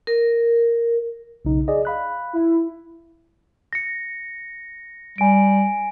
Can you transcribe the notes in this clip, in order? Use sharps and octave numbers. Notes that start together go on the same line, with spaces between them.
A#4
B1 C#3 D#4
G#4 D5 D#5
F5 B5 F#6
E4
A#6 C#7
G3 G#5 D7